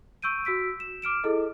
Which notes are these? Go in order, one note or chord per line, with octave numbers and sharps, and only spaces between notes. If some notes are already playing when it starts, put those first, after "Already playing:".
C#6 E6 G6 D7 D#7
F#4 E6 B6 D7
E7
D6 F6 D7 E7
E4 G#4 A4 D#5